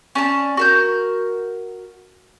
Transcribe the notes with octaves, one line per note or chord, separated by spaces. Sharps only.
C#4 D5 A5
F#4 A#4 G6